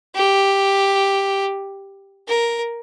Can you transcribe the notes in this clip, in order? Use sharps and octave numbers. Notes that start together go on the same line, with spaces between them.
G4
A#4